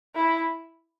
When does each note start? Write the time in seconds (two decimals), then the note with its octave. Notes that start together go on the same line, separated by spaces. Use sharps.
0.16 E4